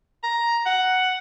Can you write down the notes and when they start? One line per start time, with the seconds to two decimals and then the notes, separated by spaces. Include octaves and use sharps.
0.24 A#5
0.66 F#5